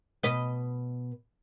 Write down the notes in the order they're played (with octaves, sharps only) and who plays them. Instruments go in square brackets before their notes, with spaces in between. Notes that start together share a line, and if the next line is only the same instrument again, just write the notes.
[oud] B2 B4 D#5